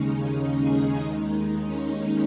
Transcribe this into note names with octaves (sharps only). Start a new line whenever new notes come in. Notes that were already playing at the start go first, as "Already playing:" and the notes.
Already playing: D#2 C#3 G#3 C#4 D#4
D#4
G#4
D#2 D#3 G#3 D#4
D#4
C#4